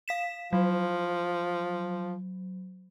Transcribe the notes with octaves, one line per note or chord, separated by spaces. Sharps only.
F5 B6 E7
F3 F#3